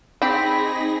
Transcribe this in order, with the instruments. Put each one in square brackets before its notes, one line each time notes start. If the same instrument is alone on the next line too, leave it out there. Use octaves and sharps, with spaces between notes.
[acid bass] C4 [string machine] D#4 G#4 A#6 [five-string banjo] G4 G5 [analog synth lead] B5